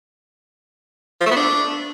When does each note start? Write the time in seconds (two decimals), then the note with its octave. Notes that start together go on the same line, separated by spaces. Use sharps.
1.21 F3
1.26 A3
1.31 B3
1.36 D4